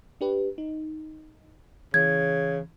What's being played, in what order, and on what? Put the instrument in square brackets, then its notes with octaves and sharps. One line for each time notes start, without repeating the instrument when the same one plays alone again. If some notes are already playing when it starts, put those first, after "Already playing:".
[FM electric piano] D4 G4 B4
D#4
[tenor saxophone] C#3 [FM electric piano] E3 [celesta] G#6